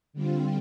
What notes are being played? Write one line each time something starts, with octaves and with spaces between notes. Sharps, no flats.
D3 G3 C4 F4